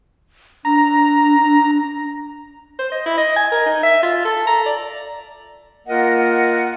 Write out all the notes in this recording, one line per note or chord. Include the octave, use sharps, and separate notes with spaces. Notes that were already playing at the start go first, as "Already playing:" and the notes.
D4 A#5
C5
D#5
E4
D#5
G#5
A#4
D#4
E5
F4
A4
A#5
D5
A#3 F4 A#4 D#5 F#5